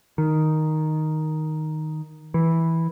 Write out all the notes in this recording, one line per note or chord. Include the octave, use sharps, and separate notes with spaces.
D#3
E3